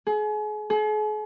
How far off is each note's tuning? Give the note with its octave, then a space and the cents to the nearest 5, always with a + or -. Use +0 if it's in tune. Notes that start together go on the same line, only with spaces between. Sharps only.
G#4 +35
G#4 +45